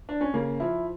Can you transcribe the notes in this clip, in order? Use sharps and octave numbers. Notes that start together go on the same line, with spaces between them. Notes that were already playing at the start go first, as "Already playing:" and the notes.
D4
C#4
C#3 A#3
F3 E4